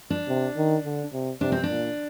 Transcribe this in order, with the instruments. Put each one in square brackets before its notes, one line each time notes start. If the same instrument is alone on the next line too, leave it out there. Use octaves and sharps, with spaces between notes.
[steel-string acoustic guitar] D4
[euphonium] C3
D#3
D3
C3
[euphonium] C3 [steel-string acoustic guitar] D4
[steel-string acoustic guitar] C4
D4
[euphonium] A#2